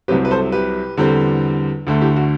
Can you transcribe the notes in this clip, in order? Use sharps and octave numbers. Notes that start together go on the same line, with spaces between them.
C2 C3 F#3 C4 G4 B4
B4
A4 C5
G4 B4
E2 D3 G3 C4
D2 D3 A3
E4 G4
F#4